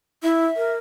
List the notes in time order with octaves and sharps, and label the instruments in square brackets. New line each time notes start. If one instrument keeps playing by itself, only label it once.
[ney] E4 [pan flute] E5
[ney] A#4